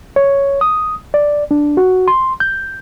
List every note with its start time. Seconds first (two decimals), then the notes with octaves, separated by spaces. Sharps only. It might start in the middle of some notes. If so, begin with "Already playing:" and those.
0.16 C#5
0.61 D#6
1.14 D5
1.51 D4
1.77 F#4
2.08 C6
2.40 G6